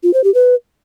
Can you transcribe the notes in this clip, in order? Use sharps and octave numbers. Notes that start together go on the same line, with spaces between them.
F4
C5
G4
B4